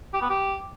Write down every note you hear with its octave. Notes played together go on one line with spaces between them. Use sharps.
G4
B3
G4